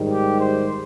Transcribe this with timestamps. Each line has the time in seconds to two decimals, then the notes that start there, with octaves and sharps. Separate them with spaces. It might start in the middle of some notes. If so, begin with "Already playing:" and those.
Already playing: G#2 D#3 G3
0.12 G4
0.41 C5